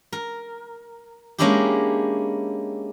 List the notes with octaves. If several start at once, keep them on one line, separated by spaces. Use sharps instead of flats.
A#4
G#3 A#3 C#4 D4 E4 G4